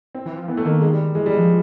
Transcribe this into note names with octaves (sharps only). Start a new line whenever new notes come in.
C4
E3
F3
E3 B3
A3
D#3 A#3
G#3
G3
E3 G#3
E3 G3
G#3
F3